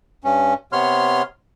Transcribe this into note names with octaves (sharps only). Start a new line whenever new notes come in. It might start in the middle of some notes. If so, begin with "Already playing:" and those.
G2 C#4
C3 B3 C#5 C6 F6